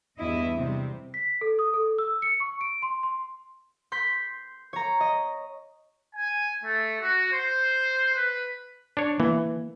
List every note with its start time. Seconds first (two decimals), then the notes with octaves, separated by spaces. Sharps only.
0.17 E2 G2 E4 D#5
0.56 C3 G3 C4
1.14 B6
1.41 A4
1.59 D#6
1.74 A4
1.99 E6
2.22 C#7
2.40 C#6
2.61 D7
2.82 C6
3.03 C6
3.92 C6 G6 B6
4.73 C#5 A#5
5.00 D#5
6.15 G#5
6.64 A3
7.01 F#4
7.33 C5
8.15 B4
8.97 D4 C#5
9.20 E3 A#3